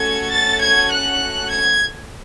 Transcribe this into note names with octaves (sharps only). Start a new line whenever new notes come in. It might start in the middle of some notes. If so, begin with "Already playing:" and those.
Already playing: A3 C#4 F#4 A4 G#6
A6
G#6
F#6
G#6